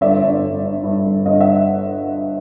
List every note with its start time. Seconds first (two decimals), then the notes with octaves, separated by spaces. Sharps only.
0.01 G1 D5 E5
0.22 G1
0.43 G1
0.64 G2
0.83 G2
1.05 G1
1.25 G1 D#5 F5
1.41 E5 F#5